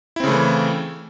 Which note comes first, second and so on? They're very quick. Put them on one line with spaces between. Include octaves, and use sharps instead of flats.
E4 C4 C#3 A3 E3